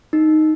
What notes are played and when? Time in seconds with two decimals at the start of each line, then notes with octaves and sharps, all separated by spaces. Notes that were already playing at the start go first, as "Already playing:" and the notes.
0.13 D#4